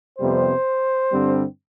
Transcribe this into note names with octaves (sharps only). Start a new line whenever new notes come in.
F2 C3 G3 B3 C5
G2 D3 G3 C4